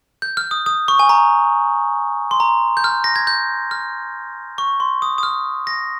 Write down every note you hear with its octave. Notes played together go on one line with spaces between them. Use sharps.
G6
F6
D#6
D#6
C#6
G#5
A#5
C6
A#5
G6
F6
A#6
G#6
G6
F6
C#6
C6
D#6
D#6
F6
A#6